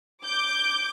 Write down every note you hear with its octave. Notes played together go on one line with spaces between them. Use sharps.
D6 G6